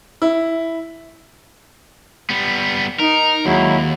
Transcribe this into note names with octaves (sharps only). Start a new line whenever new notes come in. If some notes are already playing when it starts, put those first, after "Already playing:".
E4
G3 B3
D#4 A#4
D#2 F#3 G#3 E4